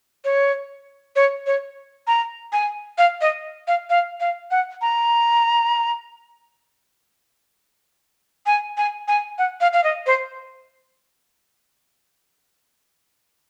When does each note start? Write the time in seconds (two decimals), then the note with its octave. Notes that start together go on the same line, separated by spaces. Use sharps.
0.25 C#5
1.16 C#5
1.46 C#5
2.07 A#5
2.53 G#5
2.98 F5
3.21 D#5
3.68 F5
3.90 F5
4.20 F5
4.51 F#5
4.81 A#5
8.46 G#5
8.77 G#5
9.08 G#5
9.38 F#5
9.61 F5
9.73 F5
9.84 D#5
10.06 C5